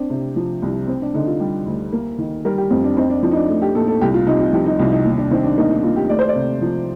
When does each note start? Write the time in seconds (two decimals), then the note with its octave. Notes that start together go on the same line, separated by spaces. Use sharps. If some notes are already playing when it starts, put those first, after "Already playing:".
Already playing: C4 D4
0.10 C3
0.36 F3
0.62 C2
0.88 C4
1.02 D4
1.14 D3 D#4
1.27 F4
1.40 G3 G4
1.66 D2
1.92 A#3
2.18 D#3
2.45 G3 A#4
2.58 G4
2.71 F2 C4
2.84 D4
2.97 C4 D#4
3.10 D4
3.23 F3 C4
3.32 D#4
3.36 D4
3.48 A3
3.62 G4
3.75 A#2 A4
3.88 A4
4.01 C2 G4
4.14 F4
4.27 C3 D#4
4.40 F4
4.53 F3 G4
4.66 D#4
4.79 C2 F4
4.92 D#4
5.05 D#2
5.18 D4
5.31 D#3 C4
5.44 D4
5.58 A#3 D#4
5.71 D#4
5.83 D#2 F4
5.96 G4
6.09 A3 D5
6.19 C5
6.29 D5
6.35 C3
6.62 F3